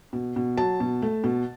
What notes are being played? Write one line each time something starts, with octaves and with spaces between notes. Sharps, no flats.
B2
B2
F#3 A5
B2
A3
B2